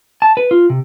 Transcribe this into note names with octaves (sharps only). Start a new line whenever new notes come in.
A5
B4
F4
C3